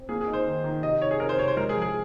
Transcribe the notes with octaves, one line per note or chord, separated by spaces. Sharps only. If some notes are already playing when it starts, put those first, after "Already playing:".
Already playing: C4
A#3 G#4
G#4
D#4
C5
D#3
D#3
C3 D#5
D#4 C#5
G#4
C4 A#4
C5
C3 C#5
C5
G#3 A#4
G#4
F3
G#4